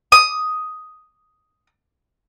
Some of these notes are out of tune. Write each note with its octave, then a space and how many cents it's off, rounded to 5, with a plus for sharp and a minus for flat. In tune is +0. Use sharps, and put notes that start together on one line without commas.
D#6 +5